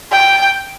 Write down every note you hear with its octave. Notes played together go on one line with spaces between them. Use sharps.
G5